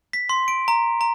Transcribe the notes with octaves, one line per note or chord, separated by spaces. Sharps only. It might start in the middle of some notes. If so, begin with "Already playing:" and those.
B6
C6
D7
A#5
A#5